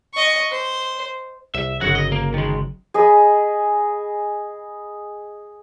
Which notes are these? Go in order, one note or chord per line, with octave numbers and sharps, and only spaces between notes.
D#5 C#6
C5
C2 E5
G1 C#3 F#3 F#4 F#5
D#5
A#3
D#3 G#3
G#4 D#5 B5